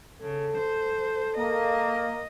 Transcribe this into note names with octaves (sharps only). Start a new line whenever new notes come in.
C#3 A4
C5
A#3 D#5